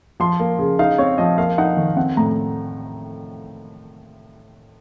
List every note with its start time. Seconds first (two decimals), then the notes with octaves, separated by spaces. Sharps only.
0.20 F3 C6
0.40 A#3
0.59 C#3
0.79 D#4 F5
0.98 C4 C#5
1.18 F3 D#5
1.38 A#3 F5
1.58 D#4 F#5
1.77 D#3
1.96 C4 F#5
2.17 A2 A#5